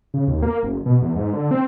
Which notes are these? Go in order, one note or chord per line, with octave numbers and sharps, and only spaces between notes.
C#3
D#2
A#3
F#1
B2
E2
G#2
D3
C4